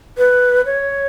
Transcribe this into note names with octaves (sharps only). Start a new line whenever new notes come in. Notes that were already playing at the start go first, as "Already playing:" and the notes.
B4
C#5